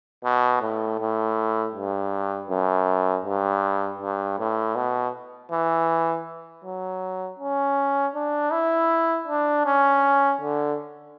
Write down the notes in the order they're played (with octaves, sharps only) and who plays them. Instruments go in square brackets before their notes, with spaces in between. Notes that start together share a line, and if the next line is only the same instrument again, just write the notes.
[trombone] B2
A2
A2
G2
F#2
G2
G2
A2
B2
E3
F#3
C#4
D4
E4
D4
C#4
D3